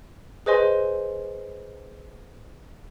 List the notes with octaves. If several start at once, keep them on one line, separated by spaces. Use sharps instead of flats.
G#4 B4 C5 D#5 G#5 C6